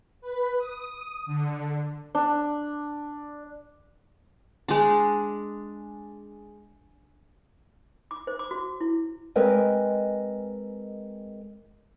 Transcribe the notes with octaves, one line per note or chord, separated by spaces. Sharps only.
B4
D#6
D3
D4
G#3 D4
D6
C5
D6
F#4
E4
G#3 C4 A#4 B4 D#5 G#5